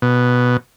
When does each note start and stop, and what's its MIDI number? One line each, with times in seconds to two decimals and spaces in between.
0.02 0.57 47